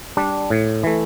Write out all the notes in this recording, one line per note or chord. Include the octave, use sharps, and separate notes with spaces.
G3 D4
A2
E3 A3